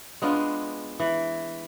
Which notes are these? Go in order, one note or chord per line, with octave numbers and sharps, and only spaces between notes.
G#3 B3 D4 F4
E3